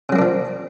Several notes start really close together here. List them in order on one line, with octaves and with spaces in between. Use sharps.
C#3 F#3 A#3 D4 F3